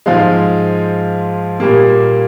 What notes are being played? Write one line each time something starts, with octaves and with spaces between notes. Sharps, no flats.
G#2 F3 G#3 F5
A#2 G3 A#3